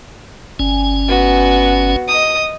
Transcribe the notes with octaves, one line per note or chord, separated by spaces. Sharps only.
G1 C#4 G#5
B3 F#4
D#5 D#6